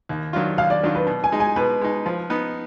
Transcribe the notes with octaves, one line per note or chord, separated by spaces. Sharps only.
D#2
D#3 F#3 D4 F4
D#2 F5
D5
D#3 F#3 D4 F4
B4
B2
G#5
G#3 D#4
G#5
B2 B4
G#3 D#4
F3
B3 D#4